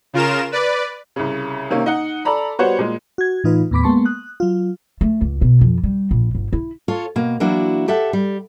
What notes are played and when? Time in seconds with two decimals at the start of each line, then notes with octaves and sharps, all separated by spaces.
0.13 C#3 F4 A#4 E7
0.52 B4 D5
1.16 C2 C#3
1.70 C3 D#3 A#3 C#4
1.86 D#4 F#5
2.25 A4 D5 A#5 B5
2.59 G3 B3 F#4 C5 C#5 F#5
2.78 A#2 G#3
3.18 F#4 G#6
3.44 A2 E3 D#4 F4 B4
3.71 D#2 A2 B3 B5 D6 B6
3.83 G#3 A#3 B3 A5 C6 C#6
4.05 D#6 F#6
4.40 F#3 F4
5.01 A3
5.21 C#2
5.41 B2
5.61 F2
5.83 G3
6.11 A#1
6.35 G1
6.53 E4
6.88 F4 A4 C#5
7.16 B2 A#3
7.40 E3 F#3 A#3 D4 E4 F#4
7.88 G4 A4 E5 F#5
8.13 G3